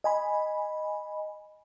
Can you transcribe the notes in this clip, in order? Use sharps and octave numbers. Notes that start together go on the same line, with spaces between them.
D#5 G#5 B5